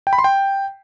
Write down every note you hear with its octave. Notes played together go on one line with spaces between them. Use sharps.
G5
B5
C6
G5